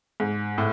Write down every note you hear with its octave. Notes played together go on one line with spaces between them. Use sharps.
G#2
A2